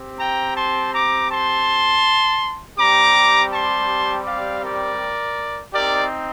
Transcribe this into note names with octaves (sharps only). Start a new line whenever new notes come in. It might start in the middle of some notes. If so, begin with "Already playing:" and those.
Already playing: C4 G4
G5 A#5
A5 C6
A#5 D6
A5 C6
G3 C4 G4 A#5 D6
A5 C6
D5 F5
A#4 D5
C4 D#4 G4 A#4 D5